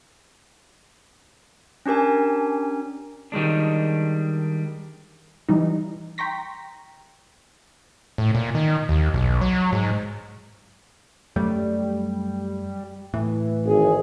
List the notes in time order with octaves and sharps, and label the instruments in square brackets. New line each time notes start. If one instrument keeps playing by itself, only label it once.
[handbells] C#4 D4 G4 A#4 G#5
[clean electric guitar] D#3 G3 G#3 D4
[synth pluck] E3 G3 D#4
G5 A#5 C6 C#6 A#6 B6
[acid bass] A2
A#2
D#3
D#2
B1
F#3
G#2
[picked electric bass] F#2 F#3 A3 [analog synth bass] G3
[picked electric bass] A2 [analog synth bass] E3
[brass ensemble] G#1 G#4